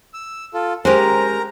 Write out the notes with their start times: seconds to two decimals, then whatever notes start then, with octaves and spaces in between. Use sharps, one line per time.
0.14 E6
0.54 F4 A4
0.85 G#3 C#4 G4 A#4 C5 A#5